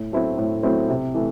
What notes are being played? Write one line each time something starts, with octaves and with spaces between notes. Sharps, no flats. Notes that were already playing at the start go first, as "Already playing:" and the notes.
Already playing: A2
F#3 A3 C4 E4
A2
F#3 A3 C4 E4
C3
E3 A3